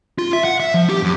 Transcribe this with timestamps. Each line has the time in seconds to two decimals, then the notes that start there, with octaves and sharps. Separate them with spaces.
0.19 F4
0.33 E5
0.45 F#5
0.60 E5
0.74 F3
0.89 G4
1.03 F#2